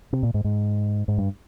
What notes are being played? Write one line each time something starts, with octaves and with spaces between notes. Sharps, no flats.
C3
A#2
G#2
G#2
G#2
G2